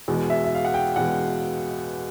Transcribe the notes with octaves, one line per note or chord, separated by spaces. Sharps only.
E2 B2 G#3
E5
E5
F5
F#5
G5
E2 B2 G#3 F#5